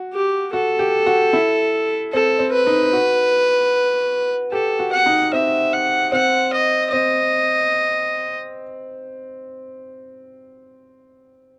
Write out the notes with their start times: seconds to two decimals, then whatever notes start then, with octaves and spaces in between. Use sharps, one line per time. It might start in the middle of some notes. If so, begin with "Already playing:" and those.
Already playing: F#4
0.14 G4
0.53 F#4 A4
0.79 G4
1.06 F#4
1.33 E4
2.13 C4 A4
2.39 C4
2.53 B4
2.67 D#4
2.93 F#4
4.52 G4 A4
4.79 F#4
4.93 F#5
5.06 D#4
5.33 C4 E5
5.73 F#5
6.12 C4 F#5
6.53 D#5
6.92 C4 D#5